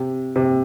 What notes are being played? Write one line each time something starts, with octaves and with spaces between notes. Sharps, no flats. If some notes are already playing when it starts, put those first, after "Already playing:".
Already playing: C3
C3